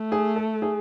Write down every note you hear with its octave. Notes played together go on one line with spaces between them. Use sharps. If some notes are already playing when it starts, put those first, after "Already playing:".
Already playing: A3
G#4
A4
G#4